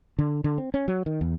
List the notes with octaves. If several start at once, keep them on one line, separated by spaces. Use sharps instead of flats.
D3
D3
C4
C#4
F#3
D#3
E2